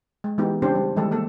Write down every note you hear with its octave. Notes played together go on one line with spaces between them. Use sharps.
G#3
E3 G#3 B3 D#4 G4
C#3 C4 D4 G4 C5
G3
D#3 E3 G3 G#3 A4
D#3 A#3 A4